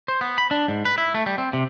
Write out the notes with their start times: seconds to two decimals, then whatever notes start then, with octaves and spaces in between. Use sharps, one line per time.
0.08 C5
0.21 B3
0.38 B5
0.51 D4
0.68 G#2
0.85 B4
0.98 E4
1.14 A3
1.26 G3
1.38 C4
1.53 C3